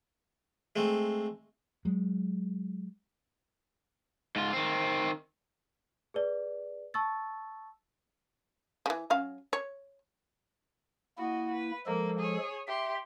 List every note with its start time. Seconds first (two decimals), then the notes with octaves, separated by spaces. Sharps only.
0.76 G#3 A3 C4
1.85 F#3 G#3
4.36 G#2 F4
4.53 D#3 C4
6.14 G#4 B4 D5
6.94 A5 C#6 E6 A6
8.86 C#3 E3
9.10 F#3 C#4 F5
9.53 C#5
11.18 A#3 E4 F#4 D#5
11.52 B4
11.87 F3 G#3 A#3 A4
12.19 G#4 C#5
12.67 G4 E5 C6